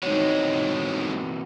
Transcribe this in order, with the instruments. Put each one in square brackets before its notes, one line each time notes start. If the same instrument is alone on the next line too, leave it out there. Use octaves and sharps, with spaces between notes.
[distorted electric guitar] B1 G#3 [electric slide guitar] E3 C4 F#4 [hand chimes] D#4 C#5